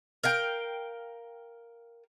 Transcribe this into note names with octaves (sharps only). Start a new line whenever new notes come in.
A#4 F5 G5